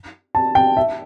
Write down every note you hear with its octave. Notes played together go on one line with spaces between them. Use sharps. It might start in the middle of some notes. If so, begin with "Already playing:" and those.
A5
G5
E5